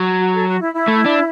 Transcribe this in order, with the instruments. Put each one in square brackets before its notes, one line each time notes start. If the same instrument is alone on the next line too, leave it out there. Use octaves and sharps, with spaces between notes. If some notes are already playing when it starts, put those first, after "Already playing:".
Already playing: [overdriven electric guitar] F#3
[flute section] F#4
A4
F#4
E4
E4
[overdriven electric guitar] A3
D4